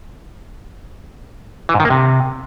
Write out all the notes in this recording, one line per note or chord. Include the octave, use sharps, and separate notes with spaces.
E3
G#2
D#3
A#3
C3